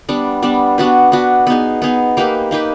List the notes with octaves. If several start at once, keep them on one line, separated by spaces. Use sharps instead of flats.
G3 B3 D4
G3 B3 D4
B3 D4 F#4 B4
B3 D4 F#4 B4
B3 D#4 G#4
B3 D#4 G#4
A#3 D#4 G4 B4
A#3 D#4 G4 B4